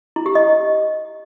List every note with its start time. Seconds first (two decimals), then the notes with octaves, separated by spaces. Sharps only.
0.16 E4
0.26 G4
0.35 D#5